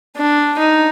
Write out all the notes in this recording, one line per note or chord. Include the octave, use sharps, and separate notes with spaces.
D4
D#4